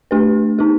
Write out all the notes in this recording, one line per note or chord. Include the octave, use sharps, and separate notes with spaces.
A3 D4 G4 B4
B3 D#4 G4